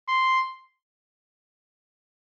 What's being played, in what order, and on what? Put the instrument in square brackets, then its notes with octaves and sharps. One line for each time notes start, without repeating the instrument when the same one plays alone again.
[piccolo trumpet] C6